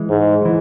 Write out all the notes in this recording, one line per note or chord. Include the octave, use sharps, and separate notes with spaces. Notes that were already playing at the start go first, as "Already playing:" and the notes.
Already playing: E3 G#3
G#2
F#3
E3